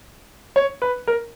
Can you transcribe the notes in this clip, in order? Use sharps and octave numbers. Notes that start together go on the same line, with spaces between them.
C#5
B4
A#4